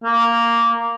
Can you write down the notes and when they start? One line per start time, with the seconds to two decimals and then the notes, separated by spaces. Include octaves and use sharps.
0.04 A#3